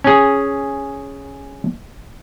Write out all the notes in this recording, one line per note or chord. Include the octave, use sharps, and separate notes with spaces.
C#4 G#4